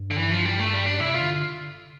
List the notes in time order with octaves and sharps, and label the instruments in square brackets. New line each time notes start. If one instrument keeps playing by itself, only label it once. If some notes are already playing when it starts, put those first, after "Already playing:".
Already playing: [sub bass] G2
[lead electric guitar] D3
E3
F3
G3
A3
G3
D4
[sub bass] C3 [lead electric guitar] E4
[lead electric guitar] F4
[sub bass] D3